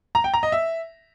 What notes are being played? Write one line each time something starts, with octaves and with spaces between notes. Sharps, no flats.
A#5
G5
A#5
D#5
E5